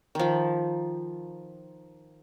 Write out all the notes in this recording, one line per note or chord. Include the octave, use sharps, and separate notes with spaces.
D#3 F3